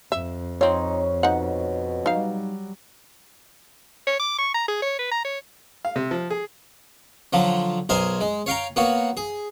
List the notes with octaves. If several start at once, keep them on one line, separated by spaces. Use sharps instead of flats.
F2 E5
C4 D#4 F4 C#5
B2 D#4 F#5
F#3 G3 D#4 F5
C#5
D6
C#6
A#5
G#4
C#5
B4
A#5
C#5
F5
C3
F3
G#4
D3 F3 F#3
B1 A#4 C5 D#5 G#5
G#3
C#5 F5 G5 A#5
A#3 B3 F#4 C#5
G#4